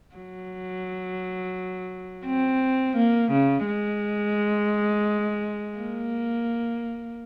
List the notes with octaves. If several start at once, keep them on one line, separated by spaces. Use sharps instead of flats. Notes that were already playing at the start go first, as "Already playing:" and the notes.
F#3
C4
A#3
C#3
G#3
A#3